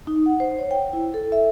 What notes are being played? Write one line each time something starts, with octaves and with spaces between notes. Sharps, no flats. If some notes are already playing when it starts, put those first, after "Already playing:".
D#4
F#5
C5
C#5
G5
E4
A4
E5